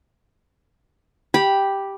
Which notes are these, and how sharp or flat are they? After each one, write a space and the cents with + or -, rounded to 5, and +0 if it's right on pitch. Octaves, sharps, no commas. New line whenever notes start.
G4 +0 B5 -10